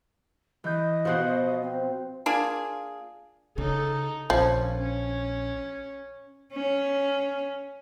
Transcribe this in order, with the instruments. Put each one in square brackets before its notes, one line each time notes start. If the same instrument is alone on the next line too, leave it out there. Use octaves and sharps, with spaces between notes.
[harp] E3 G6 [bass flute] D#5
[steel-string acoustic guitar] B2 F3 [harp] F#4 C5 F#5
[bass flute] C4
[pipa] A#3 D4 F4 G#4
[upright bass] C#3 [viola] D#4 A4
[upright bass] A#1 [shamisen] F3 [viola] C#4
[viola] C#4
[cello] C#4